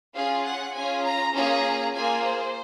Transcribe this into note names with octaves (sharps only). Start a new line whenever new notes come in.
C#4 F4 G#4 F5
F#5
C#4 F4 G#4 G#5
A#5
A#3 C#4 F4 G#4 A#5
A#3 F4 G#4 G#5
C5